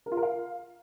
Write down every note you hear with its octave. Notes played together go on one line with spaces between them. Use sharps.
A#4
F4
A#4
F5